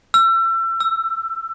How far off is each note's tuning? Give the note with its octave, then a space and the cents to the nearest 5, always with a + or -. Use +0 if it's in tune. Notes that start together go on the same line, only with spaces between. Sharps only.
E6 +35
E6 +15